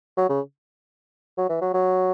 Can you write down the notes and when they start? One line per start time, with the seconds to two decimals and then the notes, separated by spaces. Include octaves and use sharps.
0.17 F#3
0.29 C#3
1.38 F#3
1.49 E3
1.61 F#3
1.74 F#3